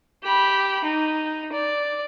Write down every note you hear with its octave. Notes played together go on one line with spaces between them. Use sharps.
G4 B5
D#4
D5